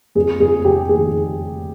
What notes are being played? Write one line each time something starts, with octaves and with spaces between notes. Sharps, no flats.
F2 G#4
F2 G#4
F1 G4
D#3 G#4